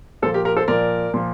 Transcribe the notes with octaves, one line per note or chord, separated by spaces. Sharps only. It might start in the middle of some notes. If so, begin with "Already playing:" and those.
A#2 F3 A4 C5
G4 A#4
G4 A#4
A4 C5
A#2 F3 A#4 D5
A#2 F3